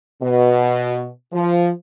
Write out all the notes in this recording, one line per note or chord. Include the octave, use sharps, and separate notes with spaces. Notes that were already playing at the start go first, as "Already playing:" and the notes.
B2
F3